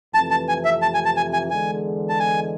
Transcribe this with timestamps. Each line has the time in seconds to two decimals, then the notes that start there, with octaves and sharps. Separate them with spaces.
0.14 F2 C3 E3 A3 A5
0.31 A5
0.49 G#5
0.65 E5
0.82 A5
0.95 G#5
1.05 A5
1.17 G#5
1.33 G#5
1.50 E2 D3 G#3 G#5
2.09 A5
2.20 G#5